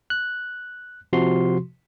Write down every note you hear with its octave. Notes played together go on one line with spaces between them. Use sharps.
F#6
C3 F3 F#4 C6